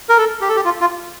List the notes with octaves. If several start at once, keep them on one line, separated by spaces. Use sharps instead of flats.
A#4
A4
G4
A4
G4
F4
F4